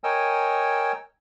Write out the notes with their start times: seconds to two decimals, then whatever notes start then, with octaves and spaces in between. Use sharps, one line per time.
0.04 A#4 C#5 D#5 G5 G#5 E6